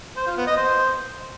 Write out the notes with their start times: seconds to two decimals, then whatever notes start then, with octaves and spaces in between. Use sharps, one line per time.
0.17 C5
0.27 F4
0.37 B3
0.47 D#5
0.57 C5